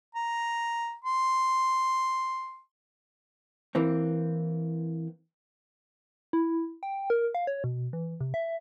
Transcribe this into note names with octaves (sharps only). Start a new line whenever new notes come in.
A#5
C6
E3 A#3 C4
E4
G5
A#4
F5
C#5
B2
E3
C3
E5